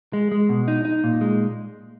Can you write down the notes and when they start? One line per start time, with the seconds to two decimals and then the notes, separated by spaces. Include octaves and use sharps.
0.13 G#3
0.32 G#3
0.49 B2
0.68 D#4
0.85 D#4
1.04 A#2
1.21 G#3